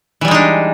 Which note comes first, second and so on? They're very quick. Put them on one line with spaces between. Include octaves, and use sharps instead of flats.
E3 G3 G#3 D#4 D4